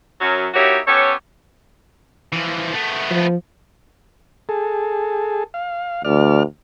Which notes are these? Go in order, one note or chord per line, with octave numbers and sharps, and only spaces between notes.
F#2 F#3 C#4
A#3 D#4 E4 F#4 G4 C#5
B3 C#4 G4 A4 C#5
E3 F3
A3 B3
F3
G#4 A4
F5
D2 D5 F6